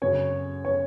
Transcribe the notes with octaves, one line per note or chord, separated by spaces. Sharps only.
F#2 C#3 F#3 C#5
C#5